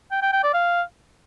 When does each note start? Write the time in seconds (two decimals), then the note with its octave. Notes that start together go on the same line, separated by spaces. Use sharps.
0.12 G5
0.22 G5
0.33 G5
0.43 D5
0.54 F5